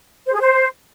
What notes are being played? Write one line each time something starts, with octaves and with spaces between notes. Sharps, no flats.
C5
G#4
C5